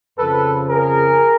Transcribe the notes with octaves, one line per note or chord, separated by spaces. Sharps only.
F2 C#3 F3 A4 B4
G#4 A#4